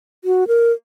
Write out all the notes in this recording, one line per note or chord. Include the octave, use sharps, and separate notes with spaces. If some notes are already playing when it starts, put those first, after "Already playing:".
F#4
A#4